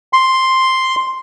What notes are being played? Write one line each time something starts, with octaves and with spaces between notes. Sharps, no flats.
C6